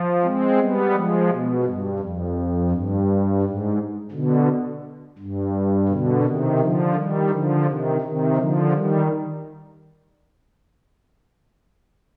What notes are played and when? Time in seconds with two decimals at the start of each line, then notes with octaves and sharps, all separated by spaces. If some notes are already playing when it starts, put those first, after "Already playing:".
Already playing: F3
0.22 G#3 C4
0.59 G3 B3
0.93 F3 G#3
1.29 B2
1.64 G2
1.99 F2
2.70 G2
3.41 G#2
4.12 B2 D3
5.18 G2
5.88 B2 D3
6.23 C3 D#3
6.59 D3 F3
6.94 D#3 G3
7.29 D3 F3
7.65 C3 D#3
8.01 C3 D#3
8.36 D3 F3
8.71 D#3 G3